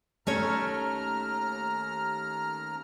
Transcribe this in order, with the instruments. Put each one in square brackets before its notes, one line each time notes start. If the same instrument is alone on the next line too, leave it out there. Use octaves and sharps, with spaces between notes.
[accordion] D#2 A#5 F6 [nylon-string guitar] A3 C#4 C#5